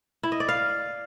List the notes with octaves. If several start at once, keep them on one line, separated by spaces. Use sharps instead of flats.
E4
D#5
D5
F5